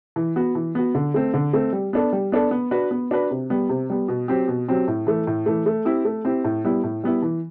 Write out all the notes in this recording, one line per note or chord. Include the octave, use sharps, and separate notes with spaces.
E3
B3 F#4
E3
B3 F#4
D3
A3 C4
D3
A3 C4
G3
B3 D4 A4
G3
B3 D4 A4
B3
D4 F#4 B4
B3
D4 F#4 B4
C3
G3 B3
C3
G3 B3
B2
F#3 C4 G4
B2
F#3 C4 G4
A2
E3 A3
A2
E3 A3
A3
C4 E4 G4
A3
C4 E4 G4
A2
G3 B3 E4
A2
G3 B3 E4
E3